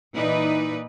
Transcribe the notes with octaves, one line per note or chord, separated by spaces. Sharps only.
A#2 E3 D#4 B4 D5